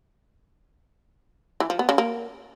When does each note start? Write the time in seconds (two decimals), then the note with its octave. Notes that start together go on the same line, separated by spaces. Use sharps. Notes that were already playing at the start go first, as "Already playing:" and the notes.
1.60 E3
1.70 F3
1.79 B3
1.89 C#3
1.98 A#3